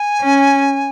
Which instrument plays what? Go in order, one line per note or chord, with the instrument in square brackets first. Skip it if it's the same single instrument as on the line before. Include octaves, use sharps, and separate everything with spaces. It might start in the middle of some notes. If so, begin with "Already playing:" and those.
Already playing: [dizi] G#5
[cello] C#4